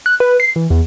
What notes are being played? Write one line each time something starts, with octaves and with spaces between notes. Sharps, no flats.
F#6
B4
C7
E3
E2